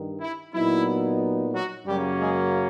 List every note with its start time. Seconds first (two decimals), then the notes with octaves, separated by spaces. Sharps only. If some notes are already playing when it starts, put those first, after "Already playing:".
Already playing: G2 D#3
0.21 E4
0.53 A#2 F#3 B3 D#4 E4
1.52 F#3 F#4
1.85 F#2 C#3 F#3 G3 A#3 C#4 G4
2.19 G#3 G#4